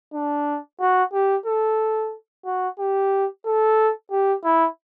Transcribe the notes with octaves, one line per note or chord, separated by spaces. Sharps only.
D4
F#4
G4
A4
F#4
G4
A4
G4
E4